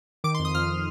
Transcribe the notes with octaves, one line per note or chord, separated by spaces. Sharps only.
D#3 D6
C6
F2
D#6
F2 F6